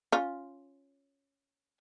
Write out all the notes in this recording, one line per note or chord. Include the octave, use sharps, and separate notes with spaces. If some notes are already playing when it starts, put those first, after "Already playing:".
C#4 F4